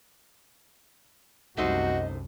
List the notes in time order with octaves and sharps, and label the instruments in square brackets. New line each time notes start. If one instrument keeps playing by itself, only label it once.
[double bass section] C2 F#2 C3 [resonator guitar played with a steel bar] A3 D#4 C5 [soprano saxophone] F#4 [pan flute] D#5